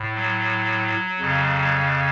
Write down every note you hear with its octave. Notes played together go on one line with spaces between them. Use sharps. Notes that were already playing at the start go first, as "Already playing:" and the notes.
Already playing: A2
F#3
F2 C#3